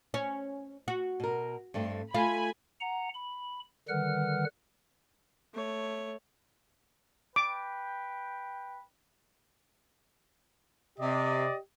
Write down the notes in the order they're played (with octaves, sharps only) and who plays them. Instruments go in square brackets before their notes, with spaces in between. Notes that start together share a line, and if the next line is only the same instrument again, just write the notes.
[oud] C#4
F#4
[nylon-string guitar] B2 A#4
G2 A3 C4
[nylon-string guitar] A3 [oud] F4 [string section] G#5 B5
[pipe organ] F#5 A#5
B5
D3 D#3 G3 B4 F#5 F6
[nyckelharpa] A3 C#5
[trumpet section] B4 G5 [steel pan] D6
[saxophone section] C3 [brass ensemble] G4 D5 D#5